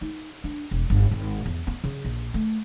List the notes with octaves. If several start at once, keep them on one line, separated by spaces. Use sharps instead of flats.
D#4
D4
E1
G1
G#1
E2
B3
C#3
A#1
A3